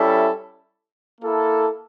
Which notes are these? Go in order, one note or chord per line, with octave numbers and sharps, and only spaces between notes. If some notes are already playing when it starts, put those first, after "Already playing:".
Already playing: G3 C#4 E4 A4 E5
A#3 E4 A4